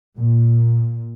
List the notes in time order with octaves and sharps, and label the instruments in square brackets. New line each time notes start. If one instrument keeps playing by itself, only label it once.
[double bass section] A#2